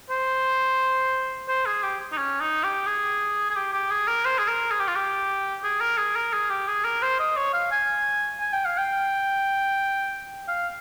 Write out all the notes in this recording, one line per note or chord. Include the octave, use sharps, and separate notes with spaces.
C5
C5
G#4
G4
D#4
C#4
D#4
G4
G#4
G#4
G4
G4
G#4
A#4
C5
G#4
A#4
G#4
G4
F4
G4
G#4
A#4
G#4
A#4
G#4
G4
G#4
A#4
C5
D#5
C#5
F5
G#5
G#5
G5
F5
G5
F5